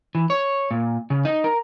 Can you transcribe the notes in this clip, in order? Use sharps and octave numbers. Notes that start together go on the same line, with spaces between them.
E3
C#5
A#2
C#3
D#4
A#4